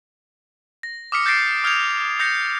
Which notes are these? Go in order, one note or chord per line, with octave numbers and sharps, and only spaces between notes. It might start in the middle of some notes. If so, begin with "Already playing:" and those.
A#6
D6 D#6 F6 B6 C#7
G6 A6 A#6 C7 D7
D#6 F6 G6 G#6 C#7 F7
D#6 G6 A#6 C#7 F7